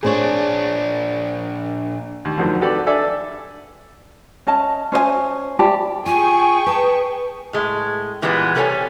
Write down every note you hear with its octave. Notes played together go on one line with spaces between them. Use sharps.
A#2 D4 G#4 C5 C#5
D#2
F2 G#2 D3 D#3 F#3 C4
F#4 G4 A4 B4 D5
D4 A4 D5 E5 G#5
C#4 D#5 A5
C#4 C5 D#5 G#5
G4 D5 A5 B5
F4 G#4 G5 G#5 C#6
B4 A5
A2 G#3
A#2 E3 G3 G#3 A#3 B3
C3 G3 A4 A#4 C#5 G#5